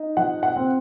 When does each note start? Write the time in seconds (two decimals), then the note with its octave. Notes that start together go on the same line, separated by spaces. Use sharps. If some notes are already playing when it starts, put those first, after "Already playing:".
Already playing: D#4
0.17 F3 F#5
0.43 F#5
0.56 C4